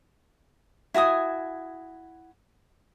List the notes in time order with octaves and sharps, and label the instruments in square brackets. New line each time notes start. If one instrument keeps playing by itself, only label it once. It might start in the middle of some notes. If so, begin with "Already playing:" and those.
[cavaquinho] E4 F#4 G#5 D#6